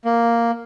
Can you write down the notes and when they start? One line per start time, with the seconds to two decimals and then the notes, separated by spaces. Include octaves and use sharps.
0.05 A#3